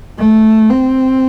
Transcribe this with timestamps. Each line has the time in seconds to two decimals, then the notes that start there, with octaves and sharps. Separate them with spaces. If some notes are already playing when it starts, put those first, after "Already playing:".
0.18 A3
0.70 C4